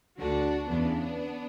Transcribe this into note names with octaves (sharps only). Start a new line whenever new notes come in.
D2 D3 D4 F#4
E2 C#3 E3 B3 D4